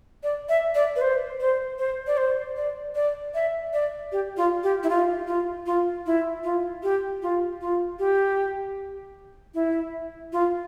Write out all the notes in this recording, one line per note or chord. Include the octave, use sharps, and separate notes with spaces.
D5
E5
D5
B4
C5
C5
C5
D5
C5
D5
D5
E5
D5
G4
F4
G4
E4
F4
F4
F4
E4
F4
G4
F4
F4
G4
E4
F4